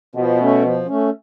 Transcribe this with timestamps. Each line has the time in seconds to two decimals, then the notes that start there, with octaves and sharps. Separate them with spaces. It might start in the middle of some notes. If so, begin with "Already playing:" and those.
0.15 B2 F3
0.39 A3 C#4
0.63 F3
0.86 A3 C#4